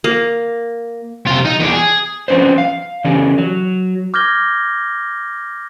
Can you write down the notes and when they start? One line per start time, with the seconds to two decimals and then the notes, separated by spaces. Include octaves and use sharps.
0.04 A#3
1.27 C3 F4
1.45 D#4
1.60 E2 D4
1.73 G#4
2.28 F3 C4 C#4 B4 C5
2.58 F5
3.04 C#3 E3 C#4 G4 A4
3.38 F#3
4.14 D6 F6 G6 G#6 A#6 G7